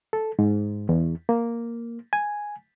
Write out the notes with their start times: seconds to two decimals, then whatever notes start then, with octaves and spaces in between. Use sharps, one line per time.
0.13 A4
0.39 G#2
0.89 E2
1.29 A#3
2.13 G#5